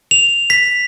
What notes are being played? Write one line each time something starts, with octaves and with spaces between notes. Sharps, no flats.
F7
B6